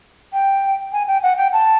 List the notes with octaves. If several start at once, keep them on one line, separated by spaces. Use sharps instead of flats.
G5
G#5
G5
F#5
G5
A5